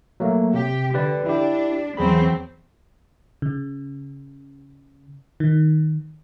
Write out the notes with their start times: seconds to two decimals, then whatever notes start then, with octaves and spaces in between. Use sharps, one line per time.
0.20 F#3 A3 A#3
0.54 C3 G4
0.94 D3 G4 B4 D5
1.26 D4 E4 G4
1.97 E2 E3 F#3 C4 G#4 B5
3.42 C#3
5.40 D#3